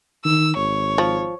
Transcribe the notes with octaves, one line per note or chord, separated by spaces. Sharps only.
D#3 E6
G#1 C#5
F3